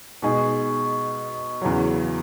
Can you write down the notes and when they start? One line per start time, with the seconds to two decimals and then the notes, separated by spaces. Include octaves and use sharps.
0.22 B2 G#3 D#4 G#4
1.62 E2 C#3 F#3